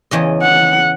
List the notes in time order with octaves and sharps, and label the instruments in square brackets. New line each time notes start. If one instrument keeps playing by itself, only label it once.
[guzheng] E2 C#3 D#5
[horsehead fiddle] F#5